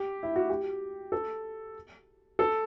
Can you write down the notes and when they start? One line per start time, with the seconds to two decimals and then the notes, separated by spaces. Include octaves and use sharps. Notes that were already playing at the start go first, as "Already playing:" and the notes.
Already playing: G4
0.23 E4
0.36 F#4
0.50 G4
1.12 A4
2.39 A4